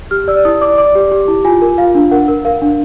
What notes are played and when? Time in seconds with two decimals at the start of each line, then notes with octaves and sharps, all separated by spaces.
0.11 G4 F6
0.28 D5 E6
0.45 E4 D#6
0.61 D5 D6
0.78 D5 D6
0.95 G4
1.12 G4
1.28 E4
1.45 F4 G#5
1.62 A#4
1.78 F4 F5
1.95 D4
2.11 A#4 F#5
2.28 A#4
2.45 A#4 F5
2.62 D4